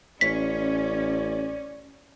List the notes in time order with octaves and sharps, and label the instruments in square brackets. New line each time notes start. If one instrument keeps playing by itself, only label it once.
[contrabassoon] A1 [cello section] C#4 [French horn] D5 [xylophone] B6